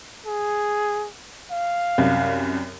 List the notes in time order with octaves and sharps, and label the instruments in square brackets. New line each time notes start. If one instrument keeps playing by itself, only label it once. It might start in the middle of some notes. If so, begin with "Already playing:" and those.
[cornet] G#4
F5
[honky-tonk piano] C2 F#2